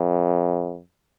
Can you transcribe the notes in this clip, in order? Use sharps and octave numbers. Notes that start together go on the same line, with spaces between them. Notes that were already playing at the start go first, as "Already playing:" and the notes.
Already playing: F2